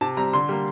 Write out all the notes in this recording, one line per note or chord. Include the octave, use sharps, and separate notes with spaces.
C3 A5
G3 C4 A#5
D3 C6
G3 A#3